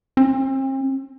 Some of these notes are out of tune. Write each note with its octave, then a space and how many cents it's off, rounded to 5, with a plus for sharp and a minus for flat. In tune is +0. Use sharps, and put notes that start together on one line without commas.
C4 +40